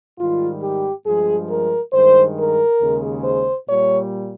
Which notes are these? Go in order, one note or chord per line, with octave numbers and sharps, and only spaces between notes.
G#2 D#3 G3 F4
G4
G2 F3 G#3 G#4
A#4
G2 D#3 G#3 C5
A#4
D#2 C#3 G#3
C5
A#2 G3 C#5